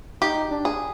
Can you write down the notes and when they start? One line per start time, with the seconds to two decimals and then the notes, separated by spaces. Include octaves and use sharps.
0.21 D#4 G4
0.51 D4
0.65 G#4